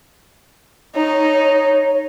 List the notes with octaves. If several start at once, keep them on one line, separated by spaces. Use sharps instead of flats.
D#4 C#5